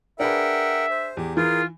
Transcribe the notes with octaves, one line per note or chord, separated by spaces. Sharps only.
D4 G#4 A#4 B4 E5 F#5 G5
C5
E2 G4
E3 F4 G#4 A#4